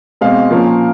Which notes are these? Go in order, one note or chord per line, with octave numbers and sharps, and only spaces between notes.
B2 G#3 C4 F5
A#2 F3 A#3 C#4